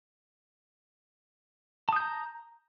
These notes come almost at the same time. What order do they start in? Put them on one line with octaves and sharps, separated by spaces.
A5 D#6 G6 A#5